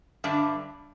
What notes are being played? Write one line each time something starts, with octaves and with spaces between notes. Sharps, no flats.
G2 D3 G3 D4 E5